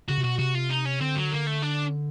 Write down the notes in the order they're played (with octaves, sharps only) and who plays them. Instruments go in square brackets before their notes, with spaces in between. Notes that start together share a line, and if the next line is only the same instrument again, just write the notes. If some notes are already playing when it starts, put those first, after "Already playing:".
[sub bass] C#3 [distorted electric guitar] F#4
[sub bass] C3
[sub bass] B2 [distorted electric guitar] F#4
[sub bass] C3 [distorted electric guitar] F#4
[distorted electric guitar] F4
D#4
C#4
[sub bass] D3 [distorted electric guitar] C4
[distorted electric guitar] F#3
A#3
A3
D4